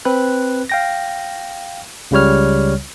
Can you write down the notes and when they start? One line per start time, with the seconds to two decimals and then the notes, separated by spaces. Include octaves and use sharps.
0.05 C4 B4 F#6
0.69 F5 G5 A#6
2.11 C#2 C#3 G3 C#5 F6